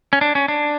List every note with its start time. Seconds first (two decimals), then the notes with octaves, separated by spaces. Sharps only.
0.13 C#4
0.21 D4
0.35 C#4
0.48 D4